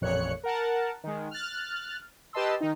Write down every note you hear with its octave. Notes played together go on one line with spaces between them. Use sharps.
A1 F2 A#2 C#5 F#6 C#7
A#4 F#5 A5
D#3 G#3
F6 F#6 A6
G4 B4 D#5 A5 C6 E6
D#3 D#4